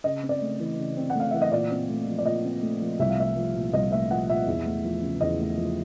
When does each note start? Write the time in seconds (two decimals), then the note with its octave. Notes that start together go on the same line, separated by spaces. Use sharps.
0.04 C#3 D#5
0.23 C4
0.29 D5
0.42 A3
0.60 E3
0.79 C#3
0.97 C4
1.10 F#5
1.15 A3 F5
1.31 E3 E5
1.42 D#5
1.52 A#2 D5
1.71 C4
1.89 A3
2.07 F3
2.18 D5
2.25 A#2 D#5
2.44 C4
2.62 A3
2.81 F3
3.00 C2 E5
3.10 F5
3.18 A3 E5
3.37 F3
3.55 A#2
3.73 C2 D#5
3.92 A3 E5
4.11 F3 F#5
4.29 A#2 E5
4.47 E2
4.66 A3
4.85 F3
5.02 C#3
5.21 E2 D#5
5.39 A3
5.58 F3